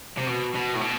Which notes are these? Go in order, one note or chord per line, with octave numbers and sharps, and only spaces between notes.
C3
B2
B2
A2
B2